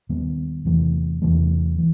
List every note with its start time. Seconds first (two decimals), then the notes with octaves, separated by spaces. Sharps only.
0.09 D#2 D#3 G3 B3
0.65 E2 C3 E3 A3
1.22 E2 C3 E3 A3
1.78 E3